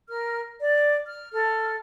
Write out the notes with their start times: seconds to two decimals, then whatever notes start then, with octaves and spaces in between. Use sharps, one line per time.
0.08 A#4 F6
0.60 D5
1.07 F6
1.32 A4 F6